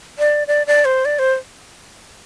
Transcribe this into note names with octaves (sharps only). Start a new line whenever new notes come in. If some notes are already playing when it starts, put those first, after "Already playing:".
D5
D5
D5
C5
D5
C5